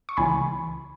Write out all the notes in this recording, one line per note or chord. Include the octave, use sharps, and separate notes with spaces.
C#6
C#2 C#3 E3 G#5 B5